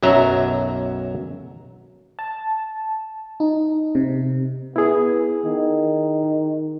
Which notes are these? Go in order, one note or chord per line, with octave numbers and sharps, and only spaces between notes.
B1 F#2 F#3 E5 A#5
A5
D#4
C3
B3 E4 G#4
D#3